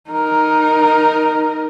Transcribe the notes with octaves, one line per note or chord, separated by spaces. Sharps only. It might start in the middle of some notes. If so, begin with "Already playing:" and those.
D#4 A#4